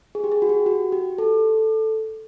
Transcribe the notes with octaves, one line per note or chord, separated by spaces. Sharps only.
G#4
G4
G#4
F#4
G4
F#4
G4
A4